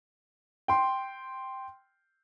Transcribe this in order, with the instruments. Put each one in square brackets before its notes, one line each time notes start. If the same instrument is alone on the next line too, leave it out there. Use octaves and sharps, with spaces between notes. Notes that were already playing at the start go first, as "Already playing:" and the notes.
[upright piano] G5 C6